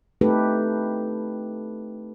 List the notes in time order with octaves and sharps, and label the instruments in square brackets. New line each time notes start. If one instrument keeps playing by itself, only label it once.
[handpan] A3 C4 D#4 G4 A4 B4